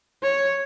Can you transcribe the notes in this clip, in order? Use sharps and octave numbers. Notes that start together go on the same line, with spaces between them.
C#5